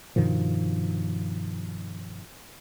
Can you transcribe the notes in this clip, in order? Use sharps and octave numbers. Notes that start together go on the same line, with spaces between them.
G2 B2 D#3 F3